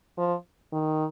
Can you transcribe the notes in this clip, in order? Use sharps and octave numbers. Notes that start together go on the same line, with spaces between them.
F3
D#3